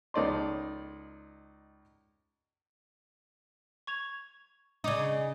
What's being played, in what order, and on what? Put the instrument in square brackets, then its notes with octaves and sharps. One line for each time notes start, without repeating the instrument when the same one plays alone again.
[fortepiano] C#2 D#4 A4 D5 D#5 C6
[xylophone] C#6 G#6 F7
[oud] C#3 D#4 [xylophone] D5 D6 D#6